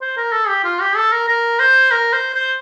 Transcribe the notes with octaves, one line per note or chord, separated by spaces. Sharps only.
C5
A#4
A4
G4
F4
G4
A4
A#4
A#4
C5
A#4
C5
C5